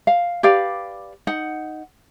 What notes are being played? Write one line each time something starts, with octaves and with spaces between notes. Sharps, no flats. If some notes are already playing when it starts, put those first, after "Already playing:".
F5
G4 B4 D5 F5
D#4 F#5